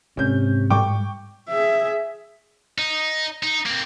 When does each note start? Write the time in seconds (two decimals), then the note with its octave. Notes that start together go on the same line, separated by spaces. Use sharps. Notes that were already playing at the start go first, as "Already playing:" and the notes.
0.17 G#2 C3 C#4 G6
0.70 A2 G3 G5 C#6 D6
1.49 G#4 E5
2.79 D#4
3.43 D#4
3.66 A#3 C4